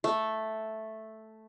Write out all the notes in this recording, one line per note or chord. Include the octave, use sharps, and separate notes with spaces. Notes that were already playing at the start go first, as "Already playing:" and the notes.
A3